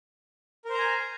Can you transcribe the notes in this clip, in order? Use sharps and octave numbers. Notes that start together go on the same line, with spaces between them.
A#4 C5 G#5 A#5